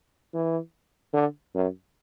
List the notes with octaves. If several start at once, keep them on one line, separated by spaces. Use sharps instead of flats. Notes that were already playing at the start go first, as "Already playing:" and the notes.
E3
D3
F#2